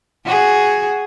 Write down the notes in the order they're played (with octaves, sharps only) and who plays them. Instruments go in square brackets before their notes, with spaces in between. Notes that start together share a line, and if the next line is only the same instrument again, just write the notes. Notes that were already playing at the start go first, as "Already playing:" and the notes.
[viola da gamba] F#4 G#4